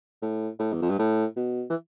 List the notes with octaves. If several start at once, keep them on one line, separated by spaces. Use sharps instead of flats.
A2
A2
E2
F2
G2
A2
B2
E3